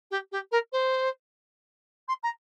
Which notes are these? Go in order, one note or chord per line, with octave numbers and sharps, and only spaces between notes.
G4
G4
A#4
C5
C6
A#5